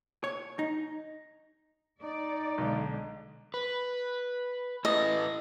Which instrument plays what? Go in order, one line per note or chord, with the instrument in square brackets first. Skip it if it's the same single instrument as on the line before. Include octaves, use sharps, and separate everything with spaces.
[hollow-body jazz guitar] C#5
D#4
[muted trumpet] D#4 [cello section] D5
[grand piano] B1 [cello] D3 G#3
[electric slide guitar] B4
[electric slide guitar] E4 A4 B4 [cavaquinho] D#5